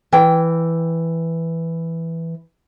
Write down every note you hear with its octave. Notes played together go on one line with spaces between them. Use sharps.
E3 G5